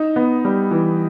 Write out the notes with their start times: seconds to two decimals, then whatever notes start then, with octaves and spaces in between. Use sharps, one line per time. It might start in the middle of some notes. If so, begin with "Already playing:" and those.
Already playing: D#4
0.16 B3
0.45 G3
0.71 E3